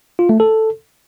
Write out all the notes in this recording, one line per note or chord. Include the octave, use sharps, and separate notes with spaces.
F4
A3
A4